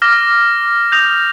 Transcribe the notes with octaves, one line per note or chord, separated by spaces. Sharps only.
D6 F6 A#6
D#6 G6 A#6 F7